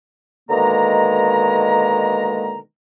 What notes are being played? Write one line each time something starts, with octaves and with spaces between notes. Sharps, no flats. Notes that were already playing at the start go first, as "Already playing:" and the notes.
B2 D3 D#3 G#3 A#3 A#5